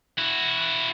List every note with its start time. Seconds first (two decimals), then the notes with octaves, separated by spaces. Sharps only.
0.18 E4 F#4